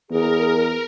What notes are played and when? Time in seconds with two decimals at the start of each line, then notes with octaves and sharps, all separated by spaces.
0.10 E2 G#4 A#4